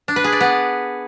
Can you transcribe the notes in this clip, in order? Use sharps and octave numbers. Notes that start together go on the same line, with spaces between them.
D4
B4
G#4
D5
B3